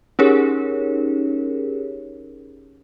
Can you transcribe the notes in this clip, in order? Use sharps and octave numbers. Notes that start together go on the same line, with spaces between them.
C#4 D#4 G4 G#4 A#4 C#5